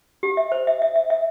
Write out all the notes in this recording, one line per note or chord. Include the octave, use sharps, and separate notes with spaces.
G4
E5
C5
E5
E5
E5
E5